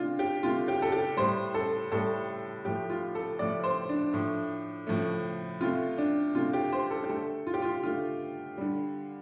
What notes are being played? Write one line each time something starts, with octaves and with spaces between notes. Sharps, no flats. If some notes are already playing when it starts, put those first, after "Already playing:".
Already playing: C3 A3 D4 F4
G4
C3 A3 F4
G4
A4
G4
A2 G3 C5
A4
A2 G3 A4
A2 F3 A3 G4
F4
A4
A2 F3 A3 D5
C5
D4
A2 F3 A3
A2 F3 A3
C3 A3 F4
D4
C3 A3 F4
G4
C5
A4
G4
D3 A3 A4
F4
G4
F4
D3 A3 F4
D3 G3